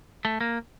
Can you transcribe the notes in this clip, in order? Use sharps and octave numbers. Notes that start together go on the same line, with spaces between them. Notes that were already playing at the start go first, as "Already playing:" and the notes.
A3
A#3